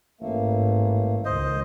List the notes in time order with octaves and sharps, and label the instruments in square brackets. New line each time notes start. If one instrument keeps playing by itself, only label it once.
[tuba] A1 [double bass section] G#2 [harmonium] A3 A#3
[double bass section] C#2 D#3 [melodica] C5 D#5